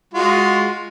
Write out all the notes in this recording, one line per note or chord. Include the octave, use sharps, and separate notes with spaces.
G#3 F4 F#4